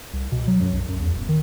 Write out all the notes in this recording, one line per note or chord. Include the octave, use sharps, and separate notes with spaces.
C2
B2
F#3
F#2
B1
F#2
E2
D#1
D#3